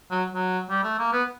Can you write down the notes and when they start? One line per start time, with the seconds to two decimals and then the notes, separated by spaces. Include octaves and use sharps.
0.11 F#3
0.34 F#3
0.70 G3
0.83 A3
0.98 A#3
1.12 B3